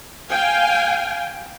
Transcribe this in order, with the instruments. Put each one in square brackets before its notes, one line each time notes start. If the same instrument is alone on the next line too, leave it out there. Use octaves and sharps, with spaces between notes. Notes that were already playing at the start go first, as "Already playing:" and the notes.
[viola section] F5 G5 G#5